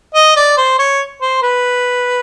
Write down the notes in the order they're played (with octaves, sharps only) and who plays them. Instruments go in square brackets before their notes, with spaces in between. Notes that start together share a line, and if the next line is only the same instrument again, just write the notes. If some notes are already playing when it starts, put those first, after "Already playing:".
[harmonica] D#5
D5
C5
C#5
C5
B4